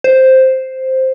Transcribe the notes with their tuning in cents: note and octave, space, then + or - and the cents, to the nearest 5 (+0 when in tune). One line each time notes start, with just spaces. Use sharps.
C5 +0